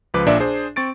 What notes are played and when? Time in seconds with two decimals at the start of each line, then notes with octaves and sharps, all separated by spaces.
0.14 C#2 F3 B4 D6
0.26 A#1 A#2 D4 D5 E5
0.40 D4 G#4 C5
0.76 C4 C#6 A6 D7